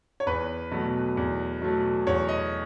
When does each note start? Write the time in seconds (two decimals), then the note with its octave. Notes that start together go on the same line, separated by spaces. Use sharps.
0.20 C#5
0.26 E2 B4
0.71 B2 F#3 A3
1.17 E2
1.62 B2 F#3 A3
2.07 E2 C#5
2.28 D#5